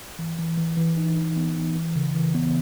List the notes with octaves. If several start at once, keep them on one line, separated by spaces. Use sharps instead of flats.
E3
E3
E3
E3
D#4
D#4
B3
D#4
E3
C#3
E3
B3